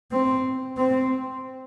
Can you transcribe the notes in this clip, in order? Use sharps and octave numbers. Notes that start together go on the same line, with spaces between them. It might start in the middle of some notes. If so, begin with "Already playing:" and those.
C4
C4